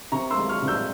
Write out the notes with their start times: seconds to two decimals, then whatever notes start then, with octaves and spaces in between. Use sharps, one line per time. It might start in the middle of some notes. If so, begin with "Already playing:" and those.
0.12 C3 A#5 C#6
0.30 C6 E6
0.37 G#3
0.49 C#6 F6
0.62 C3
0.68 E6 G6